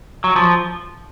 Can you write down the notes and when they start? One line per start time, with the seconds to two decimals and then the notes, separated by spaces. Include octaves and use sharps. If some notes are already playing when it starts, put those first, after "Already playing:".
0.24 F#3
0.36 F3